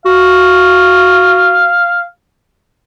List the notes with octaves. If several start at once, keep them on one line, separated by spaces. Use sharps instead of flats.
F#4 F5